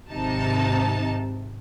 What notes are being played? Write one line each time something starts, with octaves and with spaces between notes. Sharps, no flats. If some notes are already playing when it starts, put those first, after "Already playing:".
G#1 C3 D#4 A5